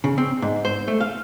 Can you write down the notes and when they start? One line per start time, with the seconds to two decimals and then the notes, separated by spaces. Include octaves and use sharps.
0.04 C#3
0.18 C4
0.42 G#2
0.65 C5
0.88 A3
1.00 F5